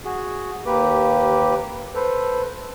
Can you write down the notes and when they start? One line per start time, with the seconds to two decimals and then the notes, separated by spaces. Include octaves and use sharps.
0.05 F#4 G#4
0.66 D#2 A#3 G4 B4 D6
1.95 A4 B4 C5